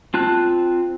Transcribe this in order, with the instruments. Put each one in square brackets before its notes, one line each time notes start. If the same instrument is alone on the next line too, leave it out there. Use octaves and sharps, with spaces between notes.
[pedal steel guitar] C4 F4 A5 F#6